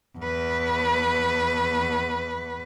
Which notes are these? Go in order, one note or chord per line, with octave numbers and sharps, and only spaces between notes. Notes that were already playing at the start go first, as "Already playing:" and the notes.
E2 B4